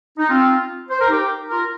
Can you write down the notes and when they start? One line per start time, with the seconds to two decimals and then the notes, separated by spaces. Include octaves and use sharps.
0.18 D#4
0.29 C4 F4
0.89 C5
1.00 A#4
1.09 D#4 G4
1.50 F4 A#4